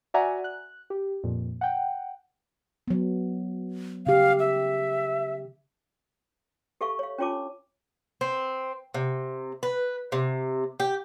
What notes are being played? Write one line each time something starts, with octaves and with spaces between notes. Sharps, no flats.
F#4 D5 E5 F#5 G#5 A#5
F#6
G4
F2 A#2
F#5 G5
F#3 B3
C#3 G4 F5
E5
G4 A4 E5 F5 C#6
C#5 F5
C#4 D4 F4 C#5 A5 D6
C4
C3
B4
C3
G4